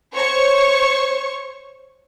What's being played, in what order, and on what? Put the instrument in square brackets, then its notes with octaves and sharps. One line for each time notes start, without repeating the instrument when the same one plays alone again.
[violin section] C5 C#5 C#6